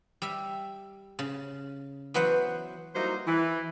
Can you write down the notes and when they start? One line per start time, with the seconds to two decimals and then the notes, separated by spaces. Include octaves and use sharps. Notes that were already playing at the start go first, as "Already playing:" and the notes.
0.22 G3 E5
1.19 C#3
2.14 E3 F#3 B3 B4 C5 F#5
2.95 F#3 G3 A#3 D#4 E4 C5
3.27 E3